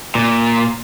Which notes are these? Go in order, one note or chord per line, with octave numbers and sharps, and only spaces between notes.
A#2